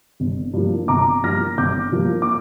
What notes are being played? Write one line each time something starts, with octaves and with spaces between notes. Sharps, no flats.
G1
G2 F3 A#3
G1 A#5 D6
G2 F3 A#3 F6 A#6
G1 D6 G6
G2 F3 A#3
D6